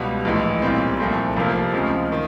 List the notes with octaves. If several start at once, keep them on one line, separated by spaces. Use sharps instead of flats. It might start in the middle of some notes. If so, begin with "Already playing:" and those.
Already playing: C#2 B2 G3
A#1 A2 E3 G#3
B1 A#2 G3 C4
C2 A#2 F3 A3 C4
F1 F2 C3 F3 A#3
D2 C#3 F3 G#3 C4
D#3